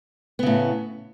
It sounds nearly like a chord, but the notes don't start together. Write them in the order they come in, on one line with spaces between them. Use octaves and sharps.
B3 C#3 A2